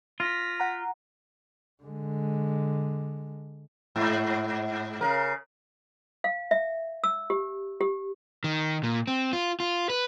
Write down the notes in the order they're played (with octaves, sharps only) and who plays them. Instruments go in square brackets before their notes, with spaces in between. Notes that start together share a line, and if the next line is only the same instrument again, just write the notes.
[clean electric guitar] F4 [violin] A#6 B6
[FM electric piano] F#5 A#5
[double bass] D3 G#3
[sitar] G#2
C#3 A#4
[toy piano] F5
E5
E6
G4
G4
[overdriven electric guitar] D#3
A#2
C4
F4
F4
B4